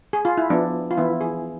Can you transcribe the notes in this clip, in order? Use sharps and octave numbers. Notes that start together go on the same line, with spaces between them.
G#4
F4
E4
F3 B3 D4
F4
E3 B3 E4
G#4